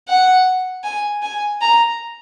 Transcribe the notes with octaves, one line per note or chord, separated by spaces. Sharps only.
F#5
G#5
G#5
A#5